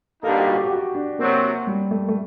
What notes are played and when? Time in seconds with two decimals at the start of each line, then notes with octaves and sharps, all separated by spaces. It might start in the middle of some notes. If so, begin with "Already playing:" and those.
0.23 G2 D3 G3 A#3 D#4 A4
0.38 G4
0.48 F#4
0.54 G4
0.65 G4
0.70 F#4
0.95 D4
1.19 C3 F#3 A#3 C4 F#4
1.67 G3
1.91 A3
2.08 A3